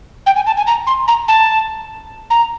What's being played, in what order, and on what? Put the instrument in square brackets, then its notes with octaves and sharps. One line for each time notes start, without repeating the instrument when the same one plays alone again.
[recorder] G5
G#5
A5
G#5
A#5
C6
A#5
A5
A#5